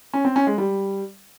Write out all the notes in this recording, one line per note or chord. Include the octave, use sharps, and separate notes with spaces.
C#4
C4
C#4
G#3
G3